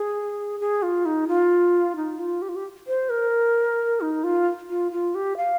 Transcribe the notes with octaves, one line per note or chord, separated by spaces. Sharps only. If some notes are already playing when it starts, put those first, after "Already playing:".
Already playing: G#4
G#4
F4
D#4
F4
D#4
F4
G4
F4
G4
C5
A#4
D#4
F4
F4
F4
G4
F5